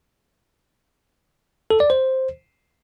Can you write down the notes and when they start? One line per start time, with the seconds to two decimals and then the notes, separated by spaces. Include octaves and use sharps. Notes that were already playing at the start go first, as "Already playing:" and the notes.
1.71 A4
1.80 D5
1.90 C5